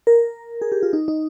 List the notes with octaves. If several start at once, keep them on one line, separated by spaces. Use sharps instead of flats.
A#4
G#4
G4
F4
D#4
D#4